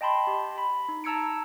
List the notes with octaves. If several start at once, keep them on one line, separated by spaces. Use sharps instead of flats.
D#5 G5 A5 B5 C6
G4
B5
D#4
A5 A#5 E6 G#6 C#7 D7